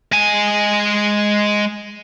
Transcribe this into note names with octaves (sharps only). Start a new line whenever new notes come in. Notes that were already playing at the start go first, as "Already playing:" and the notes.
G#3 G#5